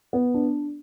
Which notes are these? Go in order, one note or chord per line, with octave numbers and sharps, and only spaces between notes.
B3
D4